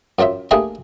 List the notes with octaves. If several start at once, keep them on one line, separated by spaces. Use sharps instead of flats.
F#2 F#3 F4 C5 E5
A3 A#3 D4 E4 G4 G#4